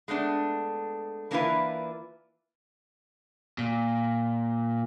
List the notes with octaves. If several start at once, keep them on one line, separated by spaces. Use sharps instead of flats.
G#3 A3 B3 D4
E3 A#3 D4 E4 F4 B4
A#2